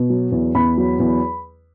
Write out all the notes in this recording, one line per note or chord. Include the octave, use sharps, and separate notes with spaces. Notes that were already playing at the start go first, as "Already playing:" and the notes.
Already playing: B2
F#3
E2
E2 B5
F#3
E2